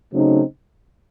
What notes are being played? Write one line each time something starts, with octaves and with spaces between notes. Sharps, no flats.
C#3 F#3 A3 C4 D#4